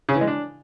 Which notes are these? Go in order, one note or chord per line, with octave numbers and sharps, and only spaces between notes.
C#3
E3
G#3
D4